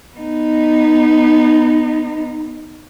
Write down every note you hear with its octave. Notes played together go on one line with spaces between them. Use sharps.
B3 D#4